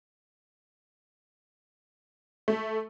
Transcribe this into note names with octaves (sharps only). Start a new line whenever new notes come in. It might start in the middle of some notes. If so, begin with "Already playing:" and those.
A3